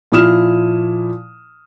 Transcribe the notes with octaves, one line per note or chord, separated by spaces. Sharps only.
A#2 F3 E4 D#6 F6 E7